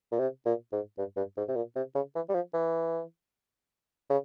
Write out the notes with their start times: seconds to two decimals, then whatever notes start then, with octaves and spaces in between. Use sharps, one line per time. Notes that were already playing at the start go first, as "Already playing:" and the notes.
0.12 A#2
0.19 C3
0.46 A#2
0.72 G#2
0.98 G2
1.17 G2
1.37 G#2
1.48 C3
1.56 A#2
1.76 C3
1.95 C#3
2.15 E3
2.29 G3
2.34 F3
2.54 E3
4.10 C#3